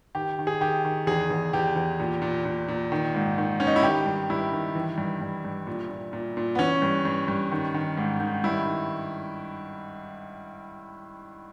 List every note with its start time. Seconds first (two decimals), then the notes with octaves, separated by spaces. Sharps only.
0.15 D#3 G4
0.39 D#3
0.47 G#4
0.61 D#3 G4
0.84 D#3
1.07 E2 G#4
1.30 E2
1.53 E2 G4
1.76 E2
2.00 A#2
2.22 A#2
2.45 A#2
2.68 A#2
2.92 D#3
3.14 G#2
3.38 D#3
3.60 D#3 C#4
3.67 D#4
3.76 E4
3.83 D#3 G4
4.06 G2
4.30 G2 E4
4.53 D#3
4.75 E3
4.98 G2
5.21 G2
5.45 G2
5.67 A#2
5.90 A#2
6.13 A#2
6.37 A#2
6.55 B3
6.59 E3 C#4
6.82 G2
7.05 G2
7.28 G2
7.52 D#3
7.74 D#3
7.97 G#2
8.20 D#3
8.44 G2 E4
8.66 D#3